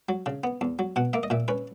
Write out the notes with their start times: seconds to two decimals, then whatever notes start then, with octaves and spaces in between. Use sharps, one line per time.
0.09 F#3
0.26 C#3
0.44 B3
0.61 E2
0.79 F#3
0.96 B2 F#5
1.13 A#3 E5
1.23 D#5
1.30 A#2 E5
1.48 C#4 B4